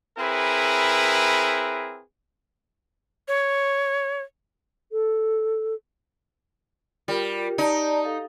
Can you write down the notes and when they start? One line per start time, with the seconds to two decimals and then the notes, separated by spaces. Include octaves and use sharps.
0.18 C4 E4 G#4 A#4 B4
3.28 C#5
4.91 A4
7.08 G3 F4 A#4
7.58 D#4 D5 A5 A#5
8.05 A4 F5